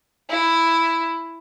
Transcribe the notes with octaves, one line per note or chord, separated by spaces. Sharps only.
E4